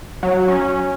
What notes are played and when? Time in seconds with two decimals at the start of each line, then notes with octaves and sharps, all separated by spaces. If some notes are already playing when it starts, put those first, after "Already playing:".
0.23 F#3
0.48 C#4